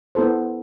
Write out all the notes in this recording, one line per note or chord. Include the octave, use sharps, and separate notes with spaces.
B3 E4 A4 C5